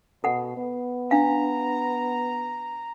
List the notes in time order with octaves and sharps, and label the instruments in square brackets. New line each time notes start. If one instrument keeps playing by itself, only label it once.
[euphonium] B2 [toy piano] A4 F#5
[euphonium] B3
[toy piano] D4 F5 [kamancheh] A#5